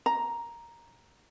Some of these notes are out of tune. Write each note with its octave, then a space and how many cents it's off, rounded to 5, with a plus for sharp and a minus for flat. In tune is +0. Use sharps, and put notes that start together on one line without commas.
A#5 +5